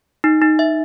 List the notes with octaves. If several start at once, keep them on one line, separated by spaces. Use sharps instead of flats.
D#4
D#4
E5